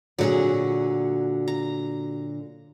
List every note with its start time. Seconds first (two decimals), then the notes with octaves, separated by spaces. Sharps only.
0.19 A#2 D3 F#3 C4 F#4 G#4
1.48 A#5